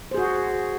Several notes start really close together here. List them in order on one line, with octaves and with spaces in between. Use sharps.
C5 G#4 F#4